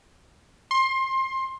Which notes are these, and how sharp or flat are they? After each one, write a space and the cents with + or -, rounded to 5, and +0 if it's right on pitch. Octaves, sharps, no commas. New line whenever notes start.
C6 +25